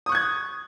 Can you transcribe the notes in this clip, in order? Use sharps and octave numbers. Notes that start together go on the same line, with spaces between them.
C#6 D#6 F#6 G#6